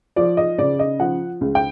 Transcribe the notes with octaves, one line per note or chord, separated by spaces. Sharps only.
F3 D5
D#5
C#3 D5
D#5
F3 F#5
C#2
G5